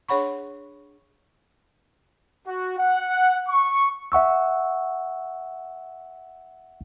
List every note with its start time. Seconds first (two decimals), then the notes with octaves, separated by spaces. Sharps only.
0.09 D4 G#4 C#5 F#5 B5 C#6
2.46 F#4
2.77 F#5
3.48 C#6
4.12 E5 F#5 C#6 E6